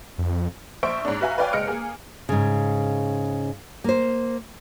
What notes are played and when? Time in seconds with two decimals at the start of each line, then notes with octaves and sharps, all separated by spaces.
0.18 F2
0.83 A#1 C5 E5 C#6 D7
1.05 G#2 C#4 D4
1.21 F#4 B4 E5 F5 G#5 A#5
1.38 B4 C#5 D5 F5 G5 G#5
1.53 F#1 G#3 D#5 F6 C#7 D7
1.67 A#3 G#4
2.29 G#2 C#3
3.84 A#3 C5